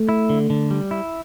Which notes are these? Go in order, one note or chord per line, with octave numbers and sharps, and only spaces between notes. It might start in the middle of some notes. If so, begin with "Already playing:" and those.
Already playing: A3
E4
D3
D3
G3
E4